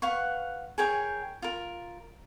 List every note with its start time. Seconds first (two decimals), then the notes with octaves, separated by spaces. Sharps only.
0.02 B4 F5 F#5 C#6
0.78 G#4 A#4 C#5 G5
1.42 F4 A#4